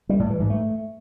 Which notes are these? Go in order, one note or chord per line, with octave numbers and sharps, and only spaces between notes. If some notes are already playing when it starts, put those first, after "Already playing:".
G3
A2
E3
G#2
A3